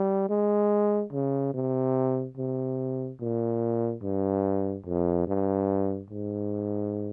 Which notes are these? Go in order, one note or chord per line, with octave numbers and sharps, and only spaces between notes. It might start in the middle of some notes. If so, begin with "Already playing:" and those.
Already playing: G3
G#3
C#3
C3
C3
A#2
G2
F2
G2
G#2